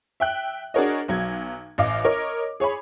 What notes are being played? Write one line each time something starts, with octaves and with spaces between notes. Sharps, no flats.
E5 G5 F#6
D4 F#4 G#4 A#4 C#5 D#5
B1 F#3 G#6
A1 D#5 F5 D6
A#4 C#5 D#5
G#4 C#5 G#5 B5